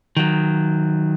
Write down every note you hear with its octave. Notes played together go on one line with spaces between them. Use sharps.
D#3 F#3